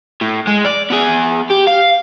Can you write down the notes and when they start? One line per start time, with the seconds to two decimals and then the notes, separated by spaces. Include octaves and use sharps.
0.21 A2
0.47 G#3
0.65 D5
0.90 B3 G#4
1.51 G4
1.67 F5